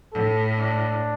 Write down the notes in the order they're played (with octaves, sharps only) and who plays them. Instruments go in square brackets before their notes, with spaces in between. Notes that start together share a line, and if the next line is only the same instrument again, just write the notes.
[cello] A2 [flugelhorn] A4
[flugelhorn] D4